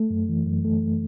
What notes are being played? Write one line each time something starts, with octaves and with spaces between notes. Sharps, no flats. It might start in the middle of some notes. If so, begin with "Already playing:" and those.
Already playing: A3
F#2
E3
F#2
A3